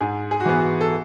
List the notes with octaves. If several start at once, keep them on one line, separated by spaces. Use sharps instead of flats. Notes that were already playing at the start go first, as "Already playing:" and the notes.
G#2 G#4
G#4
F#4
E3 B3 G#4
F#4
A4